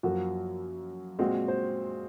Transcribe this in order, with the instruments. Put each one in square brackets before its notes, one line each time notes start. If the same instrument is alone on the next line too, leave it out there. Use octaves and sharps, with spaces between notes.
[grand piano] F#2 F3 A#3 [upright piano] F#4
[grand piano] A#2 G#3 C4 [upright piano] F#4
[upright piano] C5